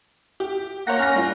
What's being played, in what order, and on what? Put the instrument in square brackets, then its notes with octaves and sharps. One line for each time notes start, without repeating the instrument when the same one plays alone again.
[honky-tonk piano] G4
[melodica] A#3 F#5 [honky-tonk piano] C#5 G6 A#6
[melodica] C#4 [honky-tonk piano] F6 A#6
[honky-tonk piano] G3 F4